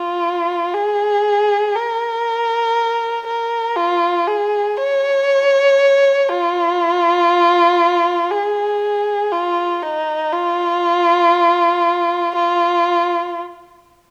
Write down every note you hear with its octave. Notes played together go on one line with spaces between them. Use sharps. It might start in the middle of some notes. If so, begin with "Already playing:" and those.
Already playing: F4
G#4
A#4
A#4
F4
G#4
C#5
F4
G#4
F4
D#4
F4
F4